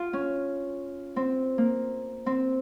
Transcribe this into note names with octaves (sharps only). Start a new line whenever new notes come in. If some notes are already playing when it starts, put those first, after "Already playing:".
Already playing: F4
C#4
C4
A#3
C4